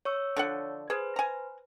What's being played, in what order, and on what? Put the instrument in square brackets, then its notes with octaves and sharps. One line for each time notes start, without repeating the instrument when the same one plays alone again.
[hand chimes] C#5 C#6 E6
[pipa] D3 F3 F#5
[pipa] G#4 [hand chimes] B4 C5
[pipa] G#5 A#5